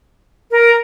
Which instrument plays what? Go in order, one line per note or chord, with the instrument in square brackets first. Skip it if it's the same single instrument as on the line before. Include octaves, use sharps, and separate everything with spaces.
[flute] A#4